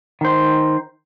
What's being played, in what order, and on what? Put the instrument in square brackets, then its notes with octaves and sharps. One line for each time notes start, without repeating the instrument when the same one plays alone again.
[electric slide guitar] D#3 C5